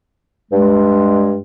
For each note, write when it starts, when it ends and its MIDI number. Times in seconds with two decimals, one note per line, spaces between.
0.52 1.37 43
0.52 1.37 56